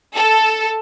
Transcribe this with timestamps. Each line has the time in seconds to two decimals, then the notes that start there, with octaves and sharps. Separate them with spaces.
0.15 A4